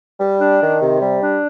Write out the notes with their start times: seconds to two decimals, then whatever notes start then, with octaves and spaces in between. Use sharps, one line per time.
0.20 G3
0.40 D4
0.61 D#3
0.81 C3
1.01 G3
1.21 D4